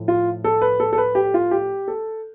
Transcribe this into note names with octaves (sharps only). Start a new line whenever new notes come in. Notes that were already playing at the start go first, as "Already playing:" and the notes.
Already playing: A2 F3 A3
F4
A4
B4
A4
A4
B4
G4
F4
G4
A4